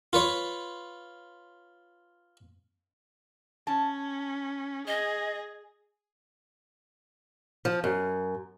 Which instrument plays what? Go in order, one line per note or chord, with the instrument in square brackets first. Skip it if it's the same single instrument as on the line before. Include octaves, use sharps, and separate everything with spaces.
[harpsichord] F4 B4 C#5
[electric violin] C#4 [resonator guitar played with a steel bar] A5
[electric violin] G#4 [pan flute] D#5
[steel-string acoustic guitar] F3
F#2